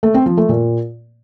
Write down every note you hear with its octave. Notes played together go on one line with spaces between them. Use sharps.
A3
C4
F3
A3
A#2